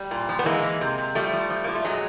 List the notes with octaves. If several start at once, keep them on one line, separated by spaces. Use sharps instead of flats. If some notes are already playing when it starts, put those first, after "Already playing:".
Already playing: G3
A#2
F3
B3
E3 G#3 A#3
E3
C3
C3
F3 G3 A3
F3
F3
F3 A#3
A3
A#2 F#3 G#3